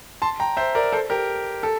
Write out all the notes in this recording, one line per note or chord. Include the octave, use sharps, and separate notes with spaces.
A5 C6
G5 A#5
C5 E5
A#4 D5
A4 C5
G4 A#4
A4